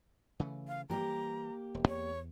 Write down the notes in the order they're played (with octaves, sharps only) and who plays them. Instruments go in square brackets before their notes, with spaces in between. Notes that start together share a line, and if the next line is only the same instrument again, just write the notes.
[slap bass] C#3 E3 A3
[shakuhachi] F5
[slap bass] E3 G3 [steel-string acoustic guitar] A#3 G4 [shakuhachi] A#5
[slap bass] E1
[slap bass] E2 [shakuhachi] C#5